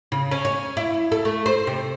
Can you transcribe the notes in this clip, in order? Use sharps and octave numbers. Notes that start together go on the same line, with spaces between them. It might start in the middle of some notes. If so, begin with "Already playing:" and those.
C#3
C#4
C#5
E4
A4
A3
C5
C3